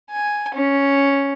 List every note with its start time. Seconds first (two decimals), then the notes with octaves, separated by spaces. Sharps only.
0.11 G#5
0.54 C#4